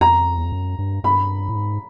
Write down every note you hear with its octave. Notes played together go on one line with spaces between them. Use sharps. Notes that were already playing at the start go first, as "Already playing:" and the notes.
F2 A#5
E2
F2
F#2
G2
G2 B5
A2
G#2